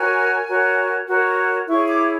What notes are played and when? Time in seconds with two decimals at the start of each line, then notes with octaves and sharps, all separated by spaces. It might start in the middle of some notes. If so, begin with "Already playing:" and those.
Already playing: F#4 A#4 C#5 G#5
0.47 F#4 A#4 C#5
1.08 F#4 A#4 C#5
1.67 E4 G#4 C#5 C#6
1.88 D6